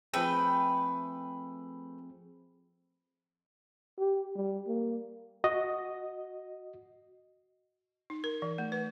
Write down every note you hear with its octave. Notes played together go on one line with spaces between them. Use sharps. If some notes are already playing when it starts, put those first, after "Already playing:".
F3 A3 C4 G#4 B4 G5
G4
G3
A#3
F#4 D#5
D#4
A#4
E3
A3
B4